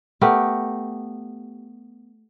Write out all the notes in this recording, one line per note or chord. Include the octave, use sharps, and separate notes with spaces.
A3 B3 G4 A#4